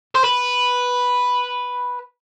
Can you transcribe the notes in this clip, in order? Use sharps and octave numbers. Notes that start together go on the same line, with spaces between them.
C5
B4